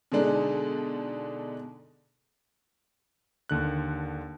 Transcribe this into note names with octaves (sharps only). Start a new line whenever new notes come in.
B2 D3 G#3 D4 D#4
D#2 D3 F#6